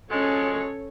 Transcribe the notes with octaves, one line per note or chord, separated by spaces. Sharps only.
F3 F#3 G#3 C#4 A4 C#5